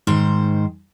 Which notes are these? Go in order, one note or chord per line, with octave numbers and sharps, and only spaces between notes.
G#2 D#3 C5